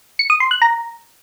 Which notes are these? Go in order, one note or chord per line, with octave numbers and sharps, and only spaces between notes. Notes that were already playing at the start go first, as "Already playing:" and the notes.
C#7
D#6
C6
F#6
A#5